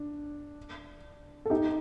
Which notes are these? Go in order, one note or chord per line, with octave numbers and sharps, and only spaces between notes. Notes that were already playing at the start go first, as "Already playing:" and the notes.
Already playing: D4
A4
D#4 G4